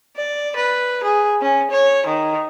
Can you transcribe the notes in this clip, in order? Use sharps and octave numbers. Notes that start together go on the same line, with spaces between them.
D5
B4
G#4
C#4
C#5
D#3